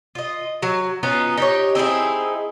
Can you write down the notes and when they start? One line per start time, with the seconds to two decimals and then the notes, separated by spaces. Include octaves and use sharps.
0.15 F4 D#5
0.62 F#3
1.03 B3 C#4 D#4 F4
1.38 D#4 G4 C#5
1.75 C4 D#4 E4 G#4